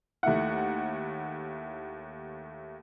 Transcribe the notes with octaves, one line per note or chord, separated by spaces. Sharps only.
D#2 A3 E4 F#5